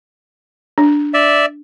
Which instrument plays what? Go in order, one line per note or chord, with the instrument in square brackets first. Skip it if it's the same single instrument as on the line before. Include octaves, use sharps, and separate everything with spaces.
[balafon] D4
[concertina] D5 E5